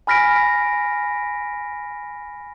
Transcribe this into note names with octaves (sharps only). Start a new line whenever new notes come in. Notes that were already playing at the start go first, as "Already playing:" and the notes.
G#5 B5 F6 A#6 B6 D7